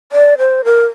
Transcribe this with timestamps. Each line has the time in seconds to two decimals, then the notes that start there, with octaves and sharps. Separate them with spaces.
0.12 D5
0.38 C5
0.65 A#4